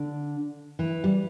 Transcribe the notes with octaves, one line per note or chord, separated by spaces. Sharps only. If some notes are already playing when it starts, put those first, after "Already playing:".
Already playing: D3
E3
G3